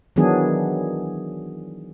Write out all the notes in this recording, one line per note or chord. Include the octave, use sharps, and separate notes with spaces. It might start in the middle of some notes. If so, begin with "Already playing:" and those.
D#3 E3 F#3 B3 D4 G#4